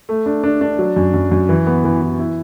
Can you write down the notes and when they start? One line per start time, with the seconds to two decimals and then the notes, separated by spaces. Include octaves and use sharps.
0.09 A3
0.26 D4
0.44 D4
0.61 D4
0.79 F#3
0.96 F#2
1.14 F#2
1.31 F#2
1.49 E3
1.67 B3
1.84 E3
2.01 E3
2.19 E4